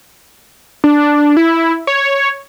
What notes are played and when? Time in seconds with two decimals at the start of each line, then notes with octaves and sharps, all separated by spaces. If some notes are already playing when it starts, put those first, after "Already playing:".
0.84 D4
1.37 E4
1.87 C#5